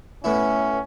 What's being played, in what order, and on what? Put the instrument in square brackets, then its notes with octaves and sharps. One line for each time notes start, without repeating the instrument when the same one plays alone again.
[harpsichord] A2 B3 E4 [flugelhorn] C#4